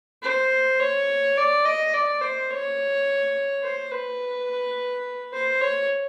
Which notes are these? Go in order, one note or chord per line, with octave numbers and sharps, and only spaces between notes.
C5
C#5
D5
D#5
D5
C5
C#5
C5
B4
C5
C#5